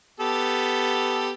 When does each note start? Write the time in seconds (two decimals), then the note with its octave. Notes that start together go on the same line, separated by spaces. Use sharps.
0.20 B3 G4 A4